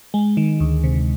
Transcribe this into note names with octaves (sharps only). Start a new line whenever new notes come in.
G#3
D#3
D2
C3